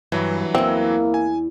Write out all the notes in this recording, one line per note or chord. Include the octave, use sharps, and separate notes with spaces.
G2 E3 F#3
E2 A#3 C4 E4
G#5